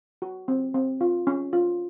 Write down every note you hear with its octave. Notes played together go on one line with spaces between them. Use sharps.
F#4
C4
C4
F4
C#4
F4